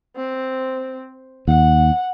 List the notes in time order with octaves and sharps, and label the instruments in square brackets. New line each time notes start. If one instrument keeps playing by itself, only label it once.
[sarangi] C4
[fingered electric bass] D#2 [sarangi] F#5